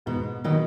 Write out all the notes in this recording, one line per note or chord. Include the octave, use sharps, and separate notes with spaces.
G#2 B2
B2 D#3 F#3 B3 D#4